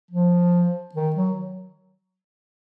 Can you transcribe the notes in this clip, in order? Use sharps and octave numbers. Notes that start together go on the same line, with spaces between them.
F3
D#3
F#3